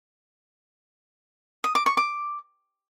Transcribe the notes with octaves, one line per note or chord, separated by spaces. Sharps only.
D#6
D6
C#6
D6